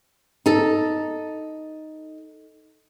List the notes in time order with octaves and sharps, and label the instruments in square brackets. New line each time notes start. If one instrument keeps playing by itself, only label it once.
[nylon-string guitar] D#4 A4